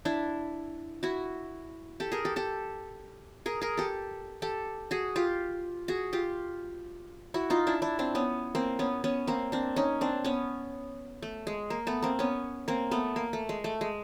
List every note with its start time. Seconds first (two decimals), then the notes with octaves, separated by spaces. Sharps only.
0.05 D4 E4
1.03 E4 F#4
2.00 G4 A4
2.12 G#4 A#4
2.25 G4 A4
2.36 G4 A4
3.46 G#4 A#4
3.61 G#4 A#4
3.77 G4 A4
4.42 G4 A4
4.91 F#4 G#4
5.16 F4 G4
5.88 F#4 G#4
6.13 F4 G4
7.34 E4 F#4
7.50 D#4 F4
7.67 D4 E4
7.82 D4 E4
7.99 C4 D4
8.15 B3 C#4
8.55 A#3 C4
8.79 B3 C#4
9.04 B3 C#4
9.27 A#3 C4
9.52 C4 D4
9.76 C#4 D#4
10.01 C4 D4
10.25 B3 C#4
11.22 A3
11.47 G#3
11.70 A#3
11.87 A3 B3
12.02 A#3 C4
12.19 B3 C#4
12.68 A#3 C4
12.91 A3 B3
13.16 A#3
13.33 A3
13.49 G#3
13.64 A3
13.81 G#3